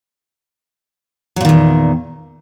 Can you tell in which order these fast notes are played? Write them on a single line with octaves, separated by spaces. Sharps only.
F#3 A#2 D#3 E2